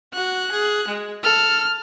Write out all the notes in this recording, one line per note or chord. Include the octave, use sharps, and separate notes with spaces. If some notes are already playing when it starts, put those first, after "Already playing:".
F#4 F#6
G#4
G#3
A4 F6